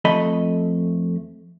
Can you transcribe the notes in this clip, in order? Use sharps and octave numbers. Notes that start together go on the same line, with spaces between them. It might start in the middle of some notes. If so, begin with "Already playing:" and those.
F2 A3 D#5 B5